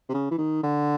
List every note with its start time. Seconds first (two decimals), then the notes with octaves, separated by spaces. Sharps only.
0.09 C3
0.14 C#3
0.31 E3
0.38 D#3
0.63 D3